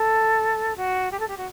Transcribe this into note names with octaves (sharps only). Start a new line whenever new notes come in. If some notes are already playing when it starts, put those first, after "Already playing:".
Already playing: A4
F#4
G4
A4
G4
F#4